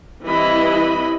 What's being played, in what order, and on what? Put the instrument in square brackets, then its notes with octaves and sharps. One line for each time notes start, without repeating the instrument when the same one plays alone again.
[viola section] E3 G3 C4 E4 D#5 B5